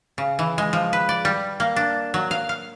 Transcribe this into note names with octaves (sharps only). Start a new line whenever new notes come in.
C#3
E3
G#3
F3
B4
D5
G3
A#3
D4
F#3
F5
F5